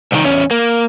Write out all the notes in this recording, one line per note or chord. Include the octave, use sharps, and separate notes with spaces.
C2 D#3
E2 C#4
A#3